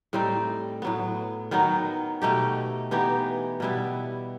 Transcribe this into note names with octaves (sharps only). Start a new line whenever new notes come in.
A2 G3 C4 D#4
A2 F#3 B3
D#3 F#3 B3 D#4
B2 A3 D#4 G4
E3 B3 D#4 G4
B2 G3 B3 E4